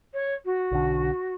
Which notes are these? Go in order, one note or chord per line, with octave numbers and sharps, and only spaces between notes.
C#5
F#4
B1 D3